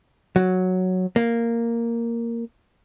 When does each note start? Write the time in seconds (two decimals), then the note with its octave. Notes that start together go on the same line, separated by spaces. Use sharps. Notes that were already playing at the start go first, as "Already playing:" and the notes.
0.36 F#3
1.16 A#3